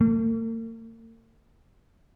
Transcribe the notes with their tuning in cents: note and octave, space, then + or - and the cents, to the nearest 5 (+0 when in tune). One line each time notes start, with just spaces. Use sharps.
A#3 -45